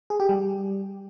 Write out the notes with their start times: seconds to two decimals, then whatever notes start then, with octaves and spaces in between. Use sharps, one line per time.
0.10 G#4
0.20 G4
0.29 G3